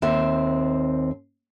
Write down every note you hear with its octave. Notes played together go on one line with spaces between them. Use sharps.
D#2 C4 E5